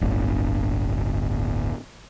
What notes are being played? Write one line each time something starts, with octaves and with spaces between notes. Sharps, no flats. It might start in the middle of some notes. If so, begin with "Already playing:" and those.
D1 G1